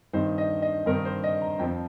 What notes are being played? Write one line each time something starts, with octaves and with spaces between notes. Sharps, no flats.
G2 D#3 C4 D#4 C5
D#5
D#5
G2 D#3 C4 D#4 A#4
C5
D#5
A#5
F2 F3 C4 G5